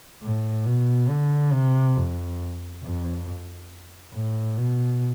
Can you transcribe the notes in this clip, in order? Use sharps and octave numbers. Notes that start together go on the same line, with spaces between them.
A2
B2
D3
C3
F2
F2
A2
B2